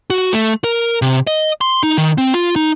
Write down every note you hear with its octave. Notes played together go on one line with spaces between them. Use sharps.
F#4
A3
A#4
C3
D#5
C6
D#4
D#3
C4
F4
D#4